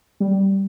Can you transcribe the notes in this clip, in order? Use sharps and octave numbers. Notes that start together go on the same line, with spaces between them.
G3